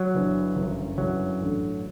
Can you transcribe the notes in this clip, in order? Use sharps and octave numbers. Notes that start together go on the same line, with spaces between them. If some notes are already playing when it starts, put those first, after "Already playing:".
Already playing: F#3
G1 G2 E3 B3
G1 F#2 E3 G3
G1 F#2 E3 F#3 G3
A1 G2 D3 A3